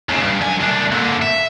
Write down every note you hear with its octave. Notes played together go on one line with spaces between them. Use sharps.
D#2 C#3
G2
F#2 G#5
C2 D4
A#2 D3
E5